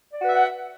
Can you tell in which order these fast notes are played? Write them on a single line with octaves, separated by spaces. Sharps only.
D5 F#4 B4 E5 F#5